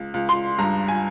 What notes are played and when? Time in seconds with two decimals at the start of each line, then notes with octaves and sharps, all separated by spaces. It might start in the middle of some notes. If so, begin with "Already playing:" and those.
Already playing: C#2
0.14 C#2
0.29 C6
0.58 G2 A#5
0.88 G#5